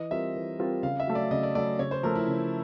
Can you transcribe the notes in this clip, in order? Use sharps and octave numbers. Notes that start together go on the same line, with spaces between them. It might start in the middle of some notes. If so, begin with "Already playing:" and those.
Already playing: E3 D#5
G3 C4 F4 A#4 E5
E3
G3 C4 F4 A#4
C#3 F5
E5
F#3 A3
D5
C#3 D#5
D5
F#3 A3 D5
C#3 C#5
C5
F3 A3 A#4
E4
C#3